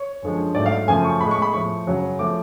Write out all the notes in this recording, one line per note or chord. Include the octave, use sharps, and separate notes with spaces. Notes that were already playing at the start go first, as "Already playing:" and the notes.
Already playing: C#5
F#2 D3 F3 G#3
G#2 F#3 A3 D5
F5
F#2 C#3 F3 A3 G#5
C#6
A2 G#3 B5
C#6
B5
A2 F3 A3 C#6
F#2 C#3 F#3
F3 A3 D6